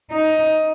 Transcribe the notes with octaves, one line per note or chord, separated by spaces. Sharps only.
D#4